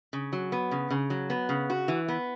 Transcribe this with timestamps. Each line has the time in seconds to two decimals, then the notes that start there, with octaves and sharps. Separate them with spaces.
0.13 C#3
0.33 F#3
0.52 B3
0.71 C#3
0.90 C#3
1.10 F#3
1.30 B3
1.49 C#3
1.70 F#4
1.88 E3
2.08 B3